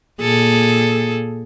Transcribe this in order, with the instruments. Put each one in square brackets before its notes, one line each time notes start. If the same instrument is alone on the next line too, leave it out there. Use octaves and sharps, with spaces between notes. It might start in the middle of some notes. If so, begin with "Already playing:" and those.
[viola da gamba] A#2 G#4 A4